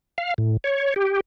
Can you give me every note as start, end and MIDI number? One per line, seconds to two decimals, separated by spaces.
0.18 0.34 77
0.38 0.57 45
0.64 0.94 73
0.96 1.20 67